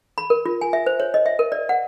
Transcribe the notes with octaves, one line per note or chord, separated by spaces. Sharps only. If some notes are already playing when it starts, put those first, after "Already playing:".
B5
A#4
F4
G#5
E5
C5
C#5
D#5
E5
A#4
D5
F#5